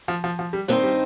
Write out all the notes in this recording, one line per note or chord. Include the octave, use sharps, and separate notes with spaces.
F3
F3
F3
G3
G2 D#3 A#3 C4 D#4 C5
G3